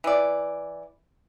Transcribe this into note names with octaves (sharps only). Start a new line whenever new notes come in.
E3 D5